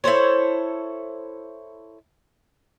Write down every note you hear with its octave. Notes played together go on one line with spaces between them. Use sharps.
E4 A4 C5 C#5